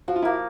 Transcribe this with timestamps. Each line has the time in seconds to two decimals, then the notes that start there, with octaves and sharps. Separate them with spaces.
0.08 F3 F#4
0.16 F4
0.22 A#3 E4 F#4